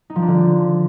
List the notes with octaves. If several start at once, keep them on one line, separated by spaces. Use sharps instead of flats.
D#4
F3
D4
D3